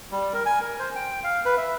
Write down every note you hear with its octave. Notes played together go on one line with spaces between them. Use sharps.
G3
A#4
G#5
A#4
C5
G5
F5
B4
E5